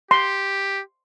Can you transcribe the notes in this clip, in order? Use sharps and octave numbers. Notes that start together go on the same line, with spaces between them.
G4 C6